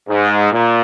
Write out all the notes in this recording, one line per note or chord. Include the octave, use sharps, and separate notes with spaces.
G#2
A#2